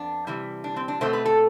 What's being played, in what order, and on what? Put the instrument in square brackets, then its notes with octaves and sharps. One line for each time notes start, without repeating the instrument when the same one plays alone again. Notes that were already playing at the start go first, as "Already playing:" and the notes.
Already playing: [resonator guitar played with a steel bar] F2 B3 D4
C3 E3 G3
D4
C4
D4
B2 A3 C4 C5
B4
A4